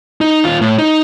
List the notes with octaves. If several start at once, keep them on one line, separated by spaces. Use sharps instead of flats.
D#4
D#2 F4
A2
D#4